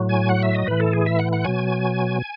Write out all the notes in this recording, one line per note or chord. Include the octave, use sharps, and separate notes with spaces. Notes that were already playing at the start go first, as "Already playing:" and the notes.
Already playing: A2 F#3
G#5
F#5
E5
D#5
A2 E3 B4
A4
G#4
E5
F#5
F#5
B2 F#3 G#5